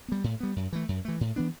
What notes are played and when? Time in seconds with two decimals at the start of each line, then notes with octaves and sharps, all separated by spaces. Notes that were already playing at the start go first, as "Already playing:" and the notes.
0.08 G3 B3
0.24 A2
0.40 G3 B3
0.56 F#2
0.73 E3 A3
0.89 F#2
1.05 E3 A3
1.21 A2
1.36 E3 B3 D4